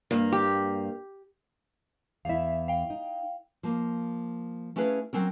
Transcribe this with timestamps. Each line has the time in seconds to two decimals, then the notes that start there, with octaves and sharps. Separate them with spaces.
0.11 G2 A#3
0.32 G4
2.25 E2 E4 E5 F5
2.68 F5 G5
2.90 D#4
3.63 F3 A#3
4.76 A3 C#4 E4 G#4 B4 F5
5.13 F#3 C4 C#4 A#4